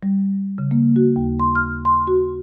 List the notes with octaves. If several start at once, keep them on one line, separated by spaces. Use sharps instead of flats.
G3
C#3
A#3
F#4
D#2
C6
F6
C6
F#4